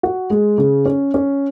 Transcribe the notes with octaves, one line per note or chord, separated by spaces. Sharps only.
F#4
G#3
C#3
C#4
C#4